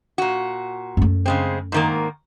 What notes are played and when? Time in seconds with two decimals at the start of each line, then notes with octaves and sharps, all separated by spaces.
0.18 A#2 F#4
0.97 F#2 A3
1.26 C#3 G#3 C4
1.72 G#2 D#3 A#3